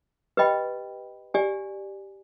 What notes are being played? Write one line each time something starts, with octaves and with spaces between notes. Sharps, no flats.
G4 B4 D#5 G5 B5
G4 D5 G#5